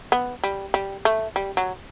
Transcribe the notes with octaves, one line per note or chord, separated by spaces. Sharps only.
B3
G3
G3
A3
G3
F#3